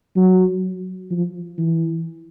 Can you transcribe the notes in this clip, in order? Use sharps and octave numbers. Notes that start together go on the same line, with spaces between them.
F#3
F3
E3